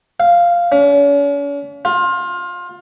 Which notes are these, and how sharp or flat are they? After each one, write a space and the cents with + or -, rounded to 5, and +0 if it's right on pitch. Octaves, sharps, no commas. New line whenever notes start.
F5 -5
C#4 +45
F4 +25